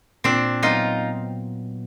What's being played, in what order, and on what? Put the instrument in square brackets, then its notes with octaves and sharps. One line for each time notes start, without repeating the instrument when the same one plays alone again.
[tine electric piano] A#2 [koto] C4 D4
[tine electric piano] F#3 B3 [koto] D#4 F4